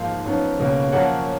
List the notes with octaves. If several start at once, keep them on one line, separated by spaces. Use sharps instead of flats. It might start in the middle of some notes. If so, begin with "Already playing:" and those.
Already playing: G#2 F3 A#3 D#4 F5
F#2 F3 B3 D#4
C#2 B2 A#3 C#4
F#2 F3 A#3 C#4 F#5